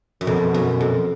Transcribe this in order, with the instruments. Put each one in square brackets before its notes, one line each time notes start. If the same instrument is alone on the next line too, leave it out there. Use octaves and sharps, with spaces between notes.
[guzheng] F#2
[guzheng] F2 [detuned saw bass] B2
[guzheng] F#2
F2